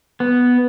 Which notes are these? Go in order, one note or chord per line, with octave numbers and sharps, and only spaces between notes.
B3